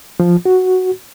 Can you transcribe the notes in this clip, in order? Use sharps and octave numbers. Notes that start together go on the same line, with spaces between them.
F3
F#4